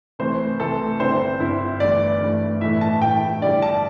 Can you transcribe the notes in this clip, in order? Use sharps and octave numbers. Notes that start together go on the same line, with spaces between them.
C2 C3 E3 A3 C5
C2 C3 E3 A3 A4
G1 G2 D3 C4 E4 C5
G1 G2 D3 C4 E4
G1 G2 E3 A3 D5
G1 G2 E3 A3
A2 E3 A3 E4 E5
A5
A2 E3 A3 E4 G5
G2 D3 G3 E4 D5
A5